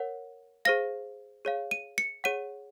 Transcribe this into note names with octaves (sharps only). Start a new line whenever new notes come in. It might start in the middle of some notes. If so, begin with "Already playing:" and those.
Already playing: A#4 C#5 F#5
G#4 C5 F5 A#6
G#4 C#5 F5
D#7
C#7
G#4 C#5 F#5 D#7